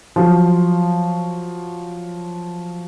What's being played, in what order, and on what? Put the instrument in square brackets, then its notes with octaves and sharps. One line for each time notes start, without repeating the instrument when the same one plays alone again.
[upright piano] F3 F#3